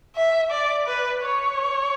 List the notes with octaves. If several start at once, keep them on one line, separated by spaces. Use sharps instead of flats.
E5
D5
B4
C#5